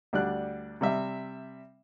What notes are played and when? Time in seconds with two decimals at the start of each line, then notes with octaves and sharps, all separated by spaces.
0.13 D2 G3 D4 F#6
0.81 C3 G3 E5